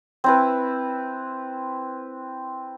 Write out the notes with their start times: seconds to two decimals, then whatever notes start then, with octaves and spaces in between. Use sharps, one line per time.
0.24 C4 E4 B4